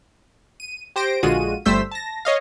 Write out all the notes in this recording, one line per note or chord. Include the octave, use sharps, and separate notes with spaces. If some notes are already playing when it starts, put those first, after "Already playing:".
D#7
G4 C5 A#6 D7
A#1 D3 G#3 F4 F#4 D#7
G1 G3 A3 C5 E6 B6
A5 A#6
C#5 D#5 F5